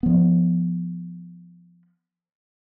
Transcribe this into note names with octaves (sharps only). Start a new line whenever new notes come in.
F3 B3